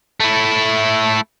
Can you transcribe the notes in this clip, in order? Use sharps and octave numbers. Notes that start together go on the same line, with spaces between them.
A3 E4